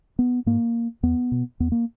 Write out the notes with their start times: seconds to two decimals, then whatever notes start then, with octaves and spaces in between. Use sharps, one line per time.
0.19 B3
0.46 G#2 A#3
1.03 E2 B3
1.32 B2
1.60 E2 B3
1.72 A#3